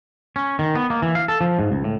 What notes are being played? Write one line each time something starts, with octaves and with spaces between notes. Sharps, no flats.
C#4
D#3
B3
A#3
E3
F5
A4
F3
G#2
C#2
A2